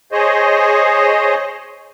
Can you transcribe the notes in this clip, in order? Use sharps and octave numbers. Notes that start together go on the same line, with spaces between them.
G#4 C5 C#5 D#5